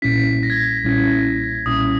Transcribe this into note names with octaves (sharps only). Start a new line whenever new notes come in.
B1 A#2 G3 C#4 E4 B6
A#6
G#6
A#6
B1 A#2 G3 C#4 E4
B1 A#2 G3 C#4 E4 D#6